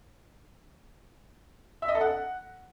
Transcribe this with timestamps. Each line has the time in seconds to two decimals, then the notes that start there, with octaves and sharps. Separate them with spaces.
1.82 E5
1.88 D#5
1.95 A4
2.01 F#5